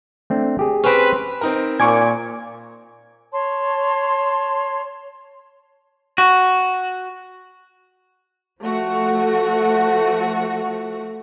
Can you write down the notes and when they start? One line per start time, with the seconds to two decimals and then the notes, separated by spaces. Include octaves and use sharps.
0.30 A3 C4 D4
0.59 G4 G#4
0.84 C4 C#4 B4
1.41 C4 D#4 A#4
1.80 A#2 G#5 C#6 D6 G#6
3.31 C#5 A5 C6
6.18 F#4
8.61 F3 A3 F#4